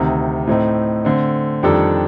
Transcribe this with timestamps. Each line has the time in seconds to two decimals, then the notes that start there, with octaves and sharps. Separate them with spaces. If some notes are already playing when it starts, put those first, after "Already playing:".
Already playing: D2 C3 D#3
0.47 A2 A3 C4 D#4
1.05 D3 A3 C4
1.63 F2 D#3 G3 D4 A4